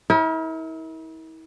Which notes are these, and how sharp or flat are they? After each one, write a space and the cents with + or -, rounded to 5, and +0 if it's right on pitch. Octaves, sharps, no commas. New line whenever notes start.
E4 -40 A#4 +0